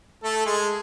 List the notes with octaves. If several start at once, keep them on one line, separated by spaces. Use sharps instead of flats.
A3 A4
G#3 G#4